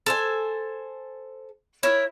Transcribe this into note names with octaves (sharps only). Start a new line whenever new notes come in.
A4 C5 G#5
E4 A#4 C#5